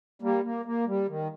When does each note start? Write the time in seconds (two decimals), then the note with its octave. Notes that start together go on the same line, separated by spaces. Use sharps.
0.22 G3 A#3
0.44 A#3
0.65 A#3
0.87 G3
1.08 D#3